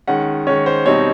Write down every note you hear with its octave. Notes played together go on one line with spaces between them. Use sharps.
D#3 G#3 C#4 F#5
D#3 G#3 C#4 C#5
C5
B2 G3 C4 D#4 C#5